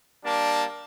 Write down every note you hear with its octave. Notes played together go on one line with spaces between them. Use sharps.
G3 A#3 D4 A5